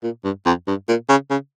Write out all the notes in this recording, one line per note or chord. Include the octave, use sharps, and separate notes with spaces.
A#2
G2
F2
G2
A#2
C#3
C#3